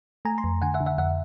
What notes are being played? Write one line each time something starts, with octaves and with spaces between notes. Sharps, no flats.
A3 G#5 A#5
A#5 C6
F2
D3 F#5 G#5
E5 F#5
D3
E5 F#5
F2 E5 F#5